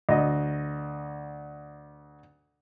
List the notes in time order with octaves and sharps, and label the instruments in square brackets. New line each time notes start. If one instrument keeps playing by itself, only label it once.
[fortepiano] D2 D#5